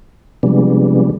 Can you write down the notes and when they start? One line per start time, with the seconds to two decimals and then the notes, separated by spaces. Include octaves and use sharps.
0.43 C3 F3 G3 G#3 B3 D4